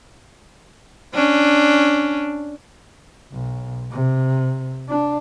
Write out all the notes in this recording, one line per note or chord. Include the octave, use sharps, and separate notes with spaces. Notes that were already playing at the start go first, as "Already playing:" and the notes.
C#4 D4
B1
C3
D4